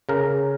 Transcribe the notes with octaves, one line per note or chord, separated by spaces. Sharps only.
C#3 A#4